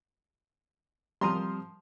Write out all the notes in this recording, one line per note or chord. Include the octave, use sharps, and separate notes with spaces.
F3 G3 C4 A#5 C6 D#6